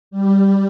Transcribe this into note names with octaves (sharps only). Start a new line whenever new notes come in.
G3